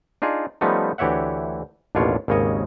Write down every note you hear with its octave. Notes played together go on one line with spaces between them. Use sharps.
D4 D#4 F4 G#4
F3 G3 A3 B3 C#4 D#4
D2 E3 G4 C#5 E5 F#5
A1 D#2 B2 D4 F4 C#5
G#1 D#2 C#3 C#5 D#5